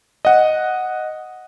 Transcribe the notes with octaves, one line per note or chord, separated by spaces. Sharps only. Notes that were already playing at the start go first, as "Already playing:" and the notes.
D#5 F#5